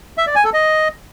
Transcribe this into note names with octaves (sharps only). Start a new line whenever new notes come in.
E5
D5
G#5
A4
D#5